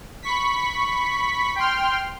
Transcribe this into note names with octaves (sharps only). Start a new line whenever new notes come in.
B5 C#6 B6
G5 C6 F6